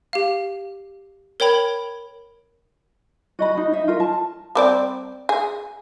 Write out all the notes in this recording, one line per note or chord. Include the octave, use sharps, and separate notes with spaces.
G4 F5
A#4 C#5 G5 B5 G#6 F7
F#4 D#5 B5
D#4 F#4
D#4 E5
F4 A#4
A5
G3 C4 D5
G#4